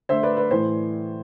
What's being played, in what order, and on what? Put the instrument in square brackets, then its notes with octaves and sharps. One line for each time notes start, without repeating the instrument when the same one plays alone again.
[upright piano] D3 A3 C5 E5
B4 D5
B4 D5
A2 E3 A3 C5